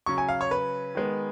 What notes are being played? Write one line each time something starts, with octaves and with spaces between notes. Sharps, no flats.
C#3 F#3 C#4 C#6
G#5
F5
C#5
B4
D#3 G#3 B3